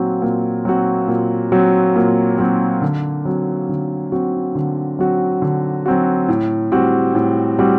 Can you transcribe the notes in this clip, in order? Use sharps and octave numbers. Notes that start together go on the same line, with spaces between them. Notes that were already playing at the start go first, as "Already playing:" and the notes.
Already playing: A#2 F#3 C4 F#4
A#2
F#3 C4 F#4
A#2
F#3 C4 F#4
A#2
F#3 C4 F#4
D3
F#3 C4 F#4
D3
F#3 C4 F#4
D3
F#3 C4 F#4
D3
F#3 C4 F#4
A2
G3 C4 F#4
A2
G3 C4 F#4